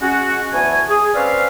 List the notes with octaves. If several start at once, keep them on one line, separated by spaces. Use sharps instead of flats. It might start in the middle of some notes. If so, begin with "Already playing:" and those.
G#3 C#4 F#4
D2 E3 B3 F#4 G#5
G#4
C4 C#4 B4 D5 F5